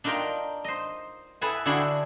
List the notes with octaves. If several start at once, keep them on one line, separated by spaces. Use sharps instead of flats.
D4 D#4 F4 A#4 G5
C5 D#5
E4 G#4 A4 B4 E5 G#5
D3 D4 E4 F#4 G#4 G5